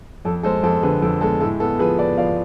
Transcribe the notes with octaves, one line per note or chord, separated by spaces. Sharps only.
F2 A4
G#3 A4 C5
F2 A4
D3 G#4 B4
F2 A4
G#3 A4
A2 A4
B3 A4
F3 G#4 B4
B3 B4 D5
F3 D5 F5